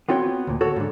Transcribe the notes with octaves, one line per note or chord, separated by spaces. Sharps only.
B3 C4 F4 F#4 C#5 G5
D2 A#2
F#4 A4 C#5
G#2 D3